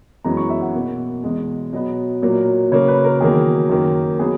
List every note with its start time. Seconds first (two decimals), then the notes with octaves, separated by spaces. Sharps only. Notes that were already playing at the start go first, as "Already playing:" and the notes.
0.24 F#2 E3 G#3 B3 A#5
0.37 C#6
0.50 E5
0.62 F#5
0.75 B2 A#3
1.24 E2 B2 G#3
1.72 B2 F#3 B3 D#5
2.22 A#2 F#3 A#3
2.72 C#3 F#3 A#3 C#5
2.88 B4
3.04 A#4
3.21 E2 D#3 F#3 A#3 G#4
3.70 F#2 D#3 A#3
4.19 F#3 B3 G#4